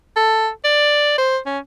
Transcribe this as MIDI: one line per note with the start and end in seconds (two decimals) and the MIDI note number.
0.16 0.50 69
0.65 1.18 74
1.18 1.39 72
1.46 1.58 61